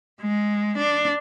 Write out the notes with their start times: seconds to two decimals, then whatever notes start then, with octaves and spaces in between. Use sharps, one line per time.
0.21 G#3
0.78 D4